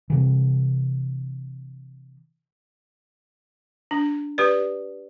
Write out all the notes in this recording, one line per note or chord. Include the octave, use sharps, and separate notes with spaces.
C3 E3
D4
G4 B4 D5